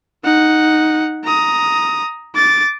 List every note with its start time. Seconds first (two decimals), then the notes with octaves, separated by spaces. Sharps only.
0.24 D#4 F#5
1.24 A#5 D#6
2.35 D6 A6